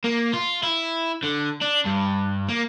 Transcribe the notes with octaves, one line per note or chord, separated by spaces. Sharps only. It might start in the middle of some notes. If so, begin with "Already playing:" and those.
A#3
F4
E4
D3
D4
G2
A#3